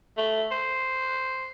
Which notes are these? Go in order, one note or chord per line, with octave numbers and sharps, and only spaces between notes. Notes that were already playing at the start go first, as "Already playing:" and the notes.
A3
C5